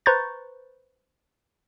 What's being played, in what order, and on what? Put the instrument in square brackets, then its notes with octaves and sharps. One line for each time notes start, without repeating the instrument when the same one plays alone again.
[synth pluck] B4 C5 A#5 C#6 G6 A6